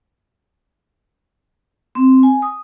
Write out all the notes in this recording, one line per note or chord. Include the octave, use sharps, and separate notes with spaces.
C4
G#5
D#6